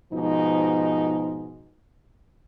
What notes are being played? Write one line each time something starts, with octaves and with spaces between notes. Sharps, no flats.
G#2 B2 F3 D#4